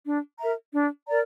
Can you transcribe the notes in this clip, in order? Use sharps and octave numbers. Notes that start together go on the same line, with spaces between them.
D4
A#4 E5 A#5
D4
A#4 D5 A#5